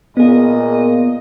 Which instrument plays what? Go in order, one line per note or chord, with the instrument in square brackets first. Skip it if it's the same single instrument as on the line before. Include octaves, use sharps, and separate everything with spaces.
[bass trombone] A#2 [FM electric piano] B3 G#4 [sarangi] D#5